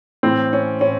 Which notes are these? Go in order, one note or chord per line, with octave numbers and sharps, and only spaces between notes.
A2 E3 C4
C#4
A2 C#4